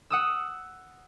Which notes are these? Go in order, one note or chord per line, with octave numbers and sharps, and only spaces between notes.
F#5 D#6 E6